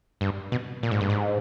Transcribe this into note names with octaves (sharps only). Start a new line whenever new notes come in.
G2
B2
A#2
G#2
G2
G#2